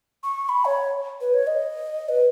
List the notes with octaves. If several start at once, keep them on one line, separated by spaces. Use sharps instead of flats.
C#6
C#6
B5
C#5
B4
C#5
D#5
B4